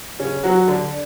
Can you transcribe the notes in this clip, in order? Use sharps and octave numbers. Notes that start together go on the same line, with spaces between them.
C#3 C#4
F#3 F#4
D3 D4